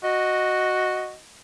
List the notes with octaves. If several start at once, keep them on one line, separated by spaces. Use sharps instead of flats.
F#4 D#5